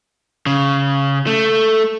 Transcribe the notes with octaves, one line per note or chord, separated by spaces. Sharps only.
C#3
A3